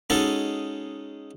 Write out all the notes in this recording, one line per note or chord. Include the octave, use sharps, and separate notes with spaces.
G#3 C#4 D#4 F#4 A4